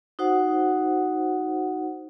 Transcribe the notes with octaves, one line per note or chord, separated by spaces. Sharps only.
D#4 F#4 C5 F#5